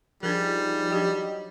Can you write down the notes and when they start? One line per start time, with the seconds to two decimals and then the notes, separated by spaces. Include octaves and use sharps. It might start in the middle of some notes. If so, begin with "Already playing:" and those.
0.23 F3 G3 D4 D#4 G#4 A#4
0.90 F#3 D4 G4 D#5 G5